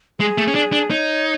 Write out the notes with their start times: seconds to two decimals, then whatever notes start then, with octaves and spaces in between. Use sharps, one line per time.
0.20 G#3 G#4
0.38 A3
0.48 C#4
0.55 D4
0.72 D4
0.90 D#4 C#5